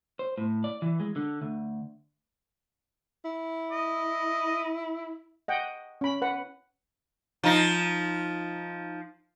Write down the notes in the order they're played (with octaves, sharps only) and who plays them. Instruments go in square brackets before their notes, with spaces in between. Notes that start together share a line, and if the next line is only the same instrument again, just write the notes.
[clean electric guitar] C5
A2
D5
E3
G#3
D3
D2
[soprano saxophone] E4
[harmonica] D#5
[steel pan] D#5 F#5 G5
C#4 B5
B4 F#5
[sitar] F3 D#4